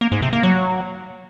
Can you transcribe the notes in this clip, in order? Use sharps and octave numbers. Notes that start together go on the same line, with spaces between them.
A#3
G#2
C3
A#3
F#3